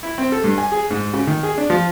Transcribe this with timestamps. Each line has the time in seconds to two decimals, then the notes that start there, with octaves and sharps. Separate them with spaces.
0.03 E4
0.18 C4
0.32 A4
0.44 G2
0.58 G#5
0.72 G#4
0.91 G#2
1.14 C#3
1.27 D#3
1.43 G#4
1.58 D4
1.70 F3